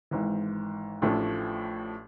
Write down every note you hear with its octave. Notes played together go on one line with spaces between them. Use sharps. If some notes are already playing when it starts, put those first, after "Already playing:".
G#1 G#2 E3
A1 A2 F3 A3 D4